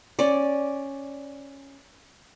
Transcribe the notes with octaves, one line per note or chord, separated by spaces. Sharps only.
C#4 D5